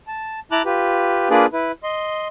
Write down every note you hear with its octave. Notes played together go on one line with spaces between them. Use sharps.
A5
E4 A5 A#5 D6 F#6
F4 G4 B4
A#3 D4 F4 G#4 B4 D5
E4 B4
D#5 C6